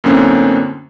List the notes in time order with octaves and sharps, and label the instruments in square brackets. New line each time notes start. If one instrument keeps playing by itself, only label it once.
[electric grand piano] F#2 A2 D3 A#3 C4 C#4